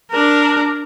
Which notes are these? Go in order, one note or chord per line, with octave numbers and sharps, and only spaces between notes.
D4 A#4